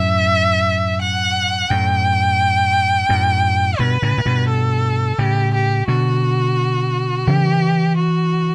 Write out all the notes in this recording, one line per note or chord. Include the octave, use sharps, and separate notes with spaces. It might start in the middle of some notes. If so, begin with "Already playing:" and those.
Already playing: F#2 A2 E5
F#5
F#2 A2 G5
F#2 A2
G2 B2 B4
A2 C#3
A2
G2 B2
A4
A2 C#3 G4
G4
B2 D3 F#4
C#3 E3 G4
F#4